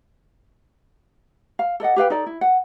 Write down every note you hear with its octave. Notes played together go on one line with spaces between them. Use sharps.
F5
A4 D5 D#5 F#5
G4 B4 F5 G5
D#4 A4 D5
E4
F#5